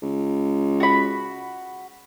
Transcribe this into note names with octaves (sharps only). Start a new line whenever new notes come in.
C#2
F#4 B5